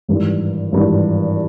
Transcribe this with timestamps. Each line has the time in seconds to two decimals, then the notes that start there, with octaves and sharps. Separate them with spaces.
0.08 G#1 G2 E3
0.72 G#1 G2 E3